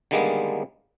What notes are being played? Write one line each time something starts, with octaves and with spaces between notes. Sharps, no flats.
D3 D#3 G3 G#3 A#3 B3